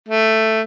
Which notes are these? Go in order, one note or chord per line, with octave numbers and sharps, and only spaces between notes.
A3